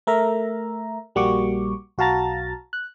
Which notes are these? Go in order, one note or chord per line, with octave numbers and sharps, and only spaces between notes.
A3 A#4 E5 A#5
A#1 G3 A#3 F#4 C#6 D6
B1 F#4 F5 A5 A#5 A6
F#6